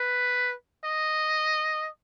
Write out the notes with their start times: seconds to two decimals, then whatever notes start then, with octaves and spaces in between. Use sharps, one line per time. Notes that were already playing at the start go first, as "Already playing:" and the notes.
Already playing: B4
0.85 D#5